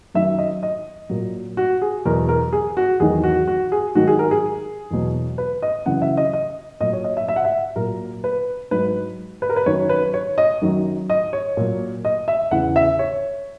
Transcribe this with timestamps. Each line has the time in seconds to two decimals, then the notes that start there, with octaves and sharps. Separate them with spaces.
0.14 F#2 D#3 F#3 E5
0.38 D#5
0.63 D#5
1.09 A#2 F#3
1.57 F#4
1.82 G#4
2.05 E2 B2 F#3 A#4
2.29 A#4
2.53 G#4
2.77 F#4
3.00 E2 D#3 F#3 G#4
3.24 F#4
3.48 F#4
3.72 G#4
3.95 G#2 D#3 F#3 F#4
4.08 G#4
4.19 A#4
4.31 G#4
4.91 E2 B2 F#3
5.38 B4
5.62 D#5
5.86 F#2 C#3 E3 F#5
6.02 E5
6.17 D#5
6.33 D#5
6.80 A#2 F#3 D#5
6.93 C#5
7.04 D#5
7.17 E5
7.28 E5
7.36 F#5
7.45 E5
7.76 A#2 F#3 A#4
8.24 B4
8.71 G#2 F#3 B4
9.42 B4
9.49 A#4
9.56 B4
9.66 F#2 D#3 F#3 C#5
9.89 B4
10.14 C#5
10.38 D#5
10.61 F#2 D#3 F#3
11.10 D#5
11.33 C#5
11.57 A#2 F#3
12.05 D#5
12.28 E5
12.51 E2 C#3 E3 F#5
12.76 E5
12.99 C#5